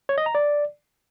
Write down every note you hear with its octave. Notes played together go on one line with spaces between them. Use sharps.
C#5
D#5
A#5
D5